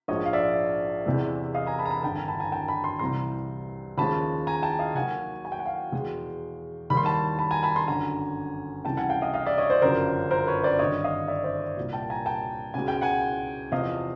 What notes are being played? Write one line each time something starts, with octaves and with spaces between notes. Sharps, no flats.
A#1 G#2 F3 G#3 C#5 D#5
F5
D5 E5
E2 C3 E3 G#3
D#5 F5
G#5 A#5
A5 B5
A#5
A5 B5
G#1 G2 D3 G5 A5
G#5 A#5
A5 B5
G#5 A#5
G5 A5
A5 B5
C6
C2 C3 E3 G3 A#5 C6
D#2 C#3 F3 G#3 A5 B5
G#5 A#5
G5 A5
D#5 F5
D#2 D#3 F#3 F#5 G#5
G#5
G5
F#5
F5 G5
E2 B2 G#3
D#2 D#3 G3 B5
C6
A5 B5
A5 B5
G#5 A#5
A5 B5
A#5 C6
G1 F#2 D3 G#5 A#5
C#2 C3 E3 G3 G5 A5
F#5 G#5
F5 G5
D#5 F5
D#5 F5
D5 E5
C#5 D#5
C5 D5
G1 F#2 C#3 F3 A#4 C5
A#4 C5
B4 C#5
C5 D5
G#1 G2 D3 C#5 D#5
D#5 F5
D5 E5
C5 D5
C2 A#2 G3
G5 A5
G#5 A#5
G5 A5
C#2 B2 G#3 G#5
G5
F#5 G#5
E2 C3 F3 D#5 F5